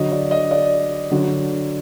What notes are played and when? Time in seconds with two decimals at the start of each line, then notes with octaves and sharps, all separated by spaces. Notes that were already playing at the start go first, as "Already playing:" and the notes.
Already playing: D3 F#3 D#5
0.12 D5
0.31 D#5
0.51 D5
1.11 D3 F#3